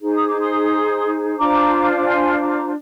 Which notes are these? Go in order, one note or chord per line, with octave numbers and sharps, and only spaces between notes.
D#4 G#4 C5
D#6
D6
C6 D#6
D4 F4 C5 A#5 D6
D6
G#5 C6
A#5 D6